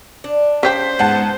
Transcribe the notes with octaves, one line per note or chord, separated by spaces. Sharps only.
D4
C#3 G4 C5 G5 B6
G#2 B3 F#5 A5